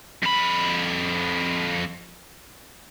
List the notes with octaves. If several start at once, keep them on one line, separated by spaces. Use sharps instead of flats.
F2 B5